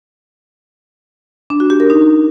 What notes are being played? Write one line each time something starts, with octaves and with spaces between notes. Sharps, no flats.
D4
F#4
G4
A#4
D#4